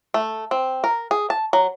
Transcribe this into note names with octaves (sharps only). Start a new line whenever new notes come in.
A3
C4
A#4
G#4
A5
F#3